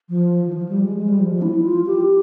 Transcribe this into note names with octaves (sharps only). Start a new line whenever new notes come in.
F3
E3
F3
G3
G#3
G#3
G3
F3
F3
E4
F4
G4